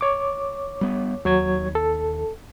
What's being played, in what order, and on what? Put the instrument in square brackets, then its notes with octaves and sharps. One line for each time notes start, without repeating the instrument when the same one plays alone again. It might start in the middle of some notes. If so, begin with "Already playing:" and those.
[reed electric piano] C#5 D6
[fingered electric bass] G3 B3
[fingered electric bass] D#2 [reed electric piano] F#3 C#5 G#6
[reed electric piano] A4